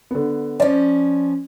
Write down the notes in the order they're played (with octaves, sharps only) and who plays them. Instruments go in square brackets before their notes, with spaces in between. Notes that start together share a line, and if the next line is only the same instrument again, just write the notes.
[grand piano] D3 B3
[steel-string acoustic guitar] F3 C#4 [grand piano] C5 D5